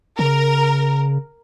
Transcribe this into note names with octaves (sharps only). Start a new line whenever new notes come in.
C#3 A#4